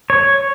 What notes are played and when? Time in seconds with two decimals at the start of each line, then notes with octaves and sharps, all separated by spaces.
0.10 C#5